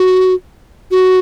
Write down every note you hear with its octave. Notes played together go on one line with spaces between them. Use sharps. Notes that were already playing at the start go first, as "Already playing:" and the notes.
Already playing: F#4
F#4